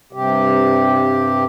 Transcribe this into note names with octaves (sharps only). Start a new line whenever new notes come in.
G2 C3 G4